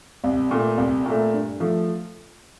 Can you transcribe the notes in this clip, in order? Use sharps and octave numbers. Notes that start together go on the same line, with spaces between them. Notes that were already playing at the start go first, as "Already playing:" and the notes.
C2
A#2 A3
C2
A#2 A3
G2
F3 A3